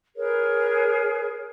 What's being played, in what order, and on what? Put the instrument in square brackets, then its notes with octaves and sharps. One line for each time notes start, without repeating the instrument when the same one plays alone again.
[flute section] G#4 A#4 B4 C#5